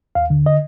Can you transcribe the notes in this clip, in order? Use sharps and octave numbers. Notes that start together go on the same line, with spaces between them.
D#2 F5
D3
D#5